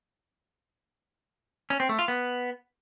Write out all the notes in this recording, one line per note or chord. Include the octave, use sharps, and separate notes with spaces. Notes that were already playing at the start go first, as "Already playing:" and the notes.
C#4
C4
A3
F4
B3